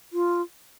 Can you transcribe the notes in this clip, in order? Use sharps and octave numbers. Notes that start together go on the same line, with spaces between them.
F4